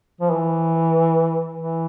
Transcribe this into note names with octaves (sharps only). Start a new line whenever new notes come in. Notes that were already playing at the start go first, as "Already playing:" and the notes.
F3
E3
E3